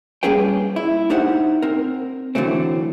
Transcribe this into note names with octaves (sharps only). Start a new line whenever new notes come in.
G3 A#3 C#4 G#4 B4 G5
E4
D4 D#4 G4 C5 F#5
C4 A#4
D3 E3 F#3 A3 C4